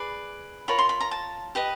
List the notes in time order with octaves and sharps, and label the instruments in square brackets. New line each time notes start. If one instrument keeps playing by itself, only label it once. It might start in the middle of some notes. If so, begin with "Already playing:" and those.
Already playing: [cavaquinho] G#4 B4 D5 B5
F4 A#4 C#5 B5
C6
B5
A#5
A5
G4 B4 D#5